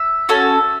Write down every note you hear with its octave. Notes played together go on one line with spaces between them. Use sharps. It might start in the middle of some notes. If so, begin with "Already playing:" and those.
Already playing: E5
C#4 F#4 A4